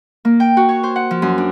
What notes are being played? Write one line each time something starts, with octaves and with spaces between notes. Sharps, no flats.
A#3
G5
F#4
C#5
C5
F#5
F3
F#2
D4